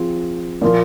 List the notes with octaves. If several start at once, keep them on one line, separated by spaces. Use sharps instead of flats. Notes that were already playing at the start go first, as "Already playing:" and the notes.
Already playing: F3 C4 F4 G#4
A#2 F3 A#3 F4